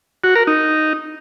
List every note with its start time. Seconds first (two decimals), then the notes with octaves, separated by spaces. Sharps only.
0.24 F#4
0.35 A#4
0.47 D#4